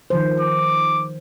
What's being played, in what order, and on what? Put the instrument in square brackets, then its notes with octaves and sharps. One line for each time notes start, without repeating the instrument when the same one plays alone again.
[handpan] D#3 F3 C5
[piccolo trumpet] D6